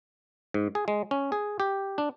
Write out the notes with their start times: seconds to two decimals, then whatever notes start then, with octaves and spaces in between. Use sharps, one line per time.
0.54 G#2
0.75 G#4
0.88 G#3
1.11 C#4
1.32 G#4
1.60 G4
1.98 D4